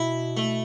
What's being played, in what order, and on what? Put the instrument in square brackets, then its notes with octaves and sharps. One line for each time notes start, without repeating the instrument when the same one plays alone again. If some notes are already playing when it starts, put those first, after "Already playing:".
Already playing: [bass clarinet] B2 [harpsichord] E4
[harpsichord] A3